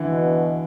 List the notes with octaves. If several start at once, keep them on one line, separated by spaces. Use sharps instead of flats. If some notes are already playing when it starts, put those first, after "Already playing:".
Already playing: D3 E3
B2